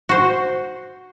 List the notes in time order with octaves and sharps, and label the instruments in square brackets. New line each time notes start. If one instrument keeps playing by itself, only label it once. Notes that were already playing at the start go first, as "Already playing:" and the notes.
[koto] F#4 C5